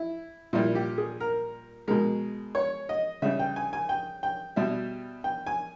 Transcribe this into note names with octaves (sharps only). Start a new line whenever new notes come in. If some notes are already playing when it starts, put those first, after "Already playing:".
Already playing: E4
A#2 G3 E4
G4
G#4
A#4
B2 G#3 A#4
C#5
D#5
C#3 G3 E5
G5
G#5
G#5
G5
G5
B2 G3 E5
G5
G#5